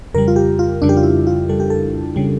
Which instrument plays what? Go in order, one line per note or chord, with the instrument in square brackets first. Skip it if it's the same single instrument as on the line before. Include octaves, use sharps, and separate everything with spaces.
[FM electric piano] F2 C#3 G3 A#4
F4
G4
F4
F2 C#3 G3 D4
G4
F4
E4
F4
F2 C#3 G3 A4
G4
A4
C#3 G3